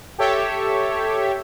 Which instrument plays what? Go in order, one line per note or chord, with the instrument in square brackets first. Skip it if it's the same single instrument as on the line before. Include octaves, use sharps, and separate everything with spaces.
[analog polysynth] G4 A4 C#5 E5